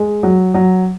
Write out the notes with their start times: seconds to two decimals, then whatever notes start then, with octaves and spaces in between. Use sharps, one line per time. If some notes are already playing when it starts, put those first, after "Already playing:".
Already playing: G#3
0.23 F#3
0.54 F#3